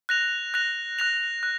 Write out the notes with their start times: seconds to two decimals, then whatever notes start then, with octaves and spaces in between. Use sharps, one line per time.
0.09 F#6 A#6 F7
0.54 F#6 A#6 F7
0.99 F#6 A#6 F7
1.43 F#6